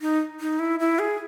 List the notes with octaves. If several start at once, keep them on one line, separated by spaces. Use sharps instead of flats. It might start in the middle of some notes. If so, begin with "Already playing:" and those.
D#4
D#4
E4
E4
G#4